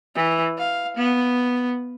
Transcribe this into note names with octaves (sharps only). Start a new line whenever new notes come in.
E3
F5
B3